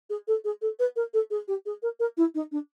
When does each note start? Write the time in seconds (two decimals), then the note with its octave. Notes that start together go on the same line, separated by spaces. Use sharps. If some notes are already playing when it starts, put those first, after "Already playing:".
0.10 G#4
0.27 A4
0.44 G#4
0.61 A4
0.79 B4
0.96 A#4
1.13 A4
1.30 G#4
1.48 G4
1.66 G#4
1.82 A#4
1.99 A#4
2.17 E4
2.35 D#4
2.51 D4